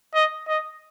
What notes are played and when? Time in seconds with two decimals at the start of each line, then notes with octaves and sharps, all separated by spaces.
0.15 D#5
0.48 D#5